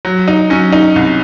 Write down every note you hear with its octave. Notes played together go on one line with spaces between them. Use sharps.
F#3
D#4
F#3 C#4
D#4
C2